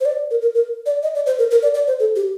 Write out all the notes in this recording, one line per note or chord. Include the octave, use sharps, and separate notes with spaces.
C5
D5
A#4
A#4
A#4
D5
D#5
D5
C5
A#4
A#4
D5
D5
C5
A4
G4